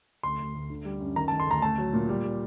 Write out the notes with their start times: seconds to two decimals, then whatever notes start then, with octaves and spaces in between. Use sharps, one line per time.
0.23 D2 C6
0.39 D2
0.54 D2
0.70 D3
0.85 G3
1.00 F#2
1.16 D#3 A#5
1.28 A5
1.32 D#3
1.40 C6
1.47 D2 A#5
1.62 A3 A5
1.78 F#3
1.93 A#2
2.09 G3
2.24 G3